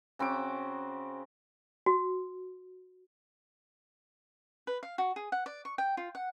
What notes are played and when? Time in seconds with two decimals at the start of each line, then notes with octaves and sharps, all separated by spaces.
0.19 C#3 C4 F#4 D6
1.86 F#4
4.67 B4
4.83 F5
4.98 F#4
5.16 G#4
5.32 F#5
5.46 D5
5.65 C#6
5.78 G5
5.97 F4
6.15 F#5